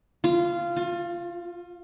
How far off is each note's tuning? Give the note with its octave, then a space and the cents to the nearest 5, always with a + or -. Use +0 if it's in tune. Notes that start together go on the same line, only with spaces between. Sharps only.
F4 -15
F4 +30